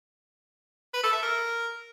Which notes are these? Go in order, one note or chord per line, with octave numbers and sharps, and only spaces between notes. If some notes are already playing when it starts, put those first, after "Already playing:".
B4
A4
E5
A#4